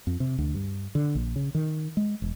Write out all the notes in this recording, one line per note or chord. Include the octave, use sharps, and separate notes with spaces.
F2
C3
D2
G2
D3
A#1
C#3
D#3
G#3
E1